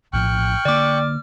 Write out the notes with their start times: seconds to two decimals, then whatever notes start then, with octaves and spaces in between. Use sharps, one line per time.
0.13 A#1 A2 F3 G5 C#6 F6 F#6
0.65 D3 A#3 D5 D6